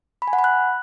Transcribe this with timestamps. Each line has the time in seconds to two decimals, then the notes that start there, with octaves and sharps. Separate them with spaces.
0.22 B5
0.27 G#5
0.33 F#5
0.39 B5
0.44 F#6